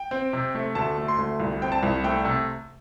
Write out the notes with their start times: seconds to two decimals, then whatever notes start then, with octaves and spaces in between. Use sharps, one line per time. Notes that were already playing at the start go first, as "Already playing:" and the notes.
Already playing: G5
0.11 C4
0.33 C3
0.55 A3
0.75 D2 A5
0.97 A3
1.08 C6
1.19 D2
1.40 C2
1.62 C4 G5
1.72 A5
1.83 C2
2.04 A3 G5
2.25 C3